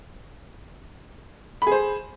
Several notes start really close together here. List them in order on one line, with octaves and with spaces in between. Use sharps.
B5 G#4 C5